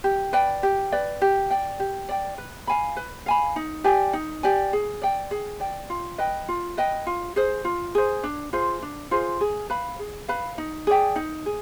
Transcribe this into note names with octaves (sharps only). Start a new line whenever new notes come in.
G4
B4 D5 G5
G4
B4 D5 G5
G4
D5 G5
G4
D5 G5
B4
F5 G#5 B5
B4
F5 G#5 B5
D#4
G4 D5 G#5
D#4
G4 D5 G#5
G#4
D5 G5
G#4
D5 G5
F4
B4 D#5 G5
F4
B4 D#5 G5
F4
G#4 C5
F4
G#4 C5
D4
F4 G#4 C5
D4
F4 G#4 C5
G#4
B4 F5 B5
G#4
B4 F5 B5
D#4
G#4 D5 G5
D#4
G#4